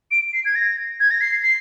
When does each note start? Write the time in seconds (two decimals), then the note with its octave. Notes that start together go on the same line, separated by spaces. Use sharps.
0.11 D7
0.33 C7
0.45 G#6
0.55 A#6
1.00 G#6
1.11 A#6
1.21 C7
1.42 C7